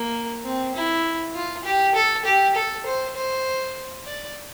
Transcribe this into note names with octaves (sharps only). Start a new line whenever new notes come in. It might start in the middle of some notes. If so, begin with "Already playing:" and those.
Already playing: A#3
C4
E4
F4
G4
A4
G4
A4
C5
C5
D5